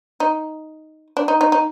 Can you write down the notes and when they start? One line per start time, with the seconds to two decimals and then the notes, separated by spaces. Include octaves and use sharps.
0.20 D#4
1.17 D4
1.28 D#4
1.41 D#4
1.52 D#4